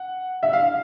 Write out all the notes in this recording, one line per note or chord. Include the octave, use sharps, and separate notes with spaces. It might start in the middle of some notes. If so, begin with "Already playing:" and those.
Already playing: F#5
E5
F5